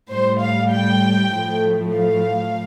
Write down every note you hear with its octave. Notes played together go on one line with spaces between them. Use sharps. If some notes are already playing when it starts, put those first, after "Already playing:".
A2 G3 C5
F5
G5
A2 F3 A3
F5